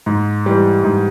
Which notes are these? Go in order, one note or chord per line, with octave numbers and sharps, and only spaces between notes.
G#2
E3 G3
G#2